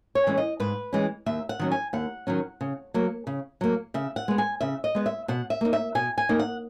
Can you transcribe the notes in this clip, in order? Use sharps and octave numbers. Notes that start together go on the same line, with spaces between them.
C#5
E3 G#3 C#4
D#5
G#2 B4
E3 G#3 C#4
D#2 E5
F#5
D#3 F#3 C#4
G#5
D#2 F#5
D#3 F#3 C#4
C#3
F#3 A#3
C#3
F#3 A#3
C#3 E5
F#5
G#3 B3
G#5
C#3 E5
D#5
G#3 B3
E5
B2 F#5
E5
A#3 D#4
E5
B2 G#5
G#5
A#3 D#4
F#5